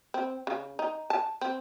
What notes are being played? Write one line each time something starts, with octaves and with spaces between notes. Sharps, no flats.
C4
C#3
D#4
A5
C4